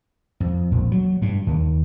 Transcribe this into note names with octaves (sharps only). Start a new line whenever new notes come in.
F2
A#1
F#3
G2
D#2